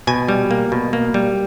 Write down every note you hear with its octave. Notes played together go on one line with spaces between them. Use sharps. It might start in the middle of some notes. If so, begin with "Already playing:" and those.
B2 G#5
G3
A#3
B2
A#3
G3